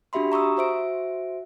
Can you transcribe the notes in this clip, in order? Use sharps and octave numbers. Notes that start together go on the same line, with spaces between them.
D4 F#4 G4 E5 B5 C6
A#5 C#6 D#6 E6
F#4 C5 E5 D7